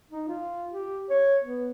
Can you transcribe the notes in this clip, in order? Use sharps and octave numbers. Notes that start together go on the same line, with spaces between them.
D#4
F4
G4
C#5
B3